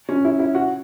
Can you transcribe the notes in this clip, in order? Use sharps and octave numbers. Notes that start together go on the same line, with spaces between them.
C#4
E4
E4
F#4